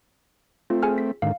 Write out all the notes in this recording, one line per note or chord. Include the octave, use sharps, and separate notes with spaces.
A3 C4 F4
G#4 G#5 F6
B6
G#2 D3 D#3 F5